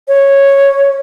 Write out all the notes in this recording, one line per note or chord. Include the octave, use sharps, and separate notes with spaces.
C#5